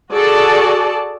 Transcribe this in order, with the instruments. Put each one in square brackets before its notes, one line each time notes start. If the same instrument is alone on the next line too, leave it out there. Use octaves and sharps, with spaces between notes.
[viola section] F#4 G#4 A4 D5 A5